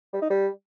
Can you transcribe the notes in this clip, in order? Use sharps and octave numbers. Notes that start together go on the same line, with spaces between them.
G3
D#4
G3